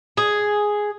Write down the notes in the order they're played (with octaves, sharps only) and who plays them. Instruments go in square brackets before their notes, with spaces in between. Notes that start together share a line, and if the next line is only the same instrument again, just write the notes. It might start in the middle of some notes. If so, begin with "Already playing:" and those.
[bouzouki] G#4